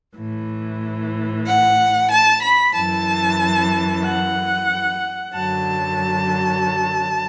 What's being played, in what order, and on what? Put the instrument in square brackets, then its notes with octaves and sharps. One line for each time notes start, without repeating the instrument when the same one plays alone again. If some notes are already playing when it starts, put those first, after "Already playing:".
[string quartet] A2 E3
F#5
A5
B5
F#2 E3 A5
F#5
F#2 D3 F#3 A5